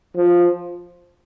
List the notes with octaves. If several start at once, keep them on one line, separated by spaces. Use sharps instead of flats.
F3